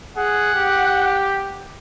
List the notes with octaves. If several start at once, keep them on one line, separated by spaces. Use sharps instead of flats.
G#4 F#5
G4